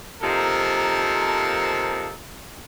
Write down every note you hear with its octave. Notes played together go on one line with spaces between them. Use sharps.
C3 F3 A#3 D#4 A4 A#4